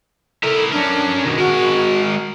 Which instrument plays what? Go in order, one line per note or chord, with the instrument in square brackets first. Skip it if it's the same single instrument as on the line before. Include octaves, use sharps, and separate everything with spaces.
[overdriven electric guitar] E4 A#4 [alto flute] A4
[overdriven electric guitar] C#4 A#4 [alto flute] D4
[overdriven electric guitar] B2 D#3
[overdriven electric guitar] G#3 A#4 [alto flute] F#4